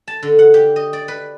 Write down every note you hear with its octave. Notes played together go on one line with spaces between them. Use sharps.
A5
D3
F#5
G4
D#5
D5
B4